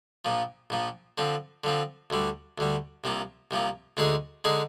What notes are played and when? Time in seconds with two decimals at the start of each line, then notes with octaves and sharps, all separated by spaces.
0.25 A#1 A#2 F3
0.70 A#1 A#2 F3
1.18 D3 F3 C4
1.64 D3 F3 C4
2.10 D2 D3 G3
2.58 D2 D3 G3
3.04 C2 C3 F3 A#3
3.51 C2 C3 F3 A#3
3.97 D2 D3 G#3 D#4 G#4
4.44 D3 G#3 D#4 G#4